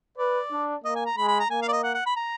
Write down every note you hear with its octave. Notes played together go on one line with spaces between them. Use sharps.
B4 D5
D4
A#3 D#5
G#5
A#5
G#3 B5
B5
A#5
A#3 G#5
F5
D5
D#5
F#5
F#5
B5
A#5